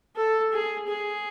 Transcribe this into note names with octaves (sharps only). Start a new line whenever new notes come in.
A4
G#4
G#4